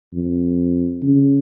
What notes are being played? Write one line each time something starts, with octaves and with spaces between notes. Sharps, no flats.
F2
C#3